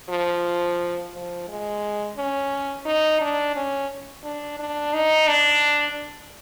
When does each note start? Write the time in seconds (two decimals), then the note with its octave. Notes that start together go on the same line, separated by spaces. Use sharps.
0.10 F3
1.14 F3
1.49 G#3
2.17 C#4
2.86 D#4
3.21 D4
3.56 C#4
4.24 D4
4.60 D4
4.94 D#4
5.28 D4